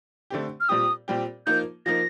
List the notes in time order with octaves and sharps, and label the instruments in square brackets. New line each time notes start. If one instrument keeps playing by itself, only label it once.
[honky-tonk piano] D3 A3 C4 G4
[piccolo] F6
[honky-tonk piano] A#2 G3 C4 G4 [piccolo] D#6
[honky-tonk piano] A#2 G3 C4 G4
[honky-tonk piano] F3 A#3 D#4 [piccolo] G6
[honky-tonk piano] F3 A#3 D#4 [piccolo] A#6